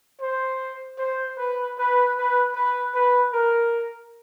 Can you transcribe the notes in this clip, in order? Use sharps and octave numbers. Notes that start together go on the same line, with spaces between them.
C5
C5
B4
B4
B4
B4
B4
A#4